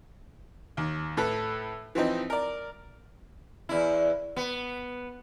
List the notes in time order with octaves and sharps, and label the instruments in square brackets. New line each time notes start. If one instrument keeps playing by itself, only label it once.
[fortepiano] D#2
A2 A4 B4
E3 F3 C4 D#4
A#4 D5
[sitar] E2 E4
B3